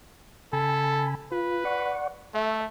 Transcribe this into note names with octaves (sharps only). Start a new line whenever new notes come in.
C#3 A4 G#5 B5
F4 B4
D5 F#5 C#6
A3 E5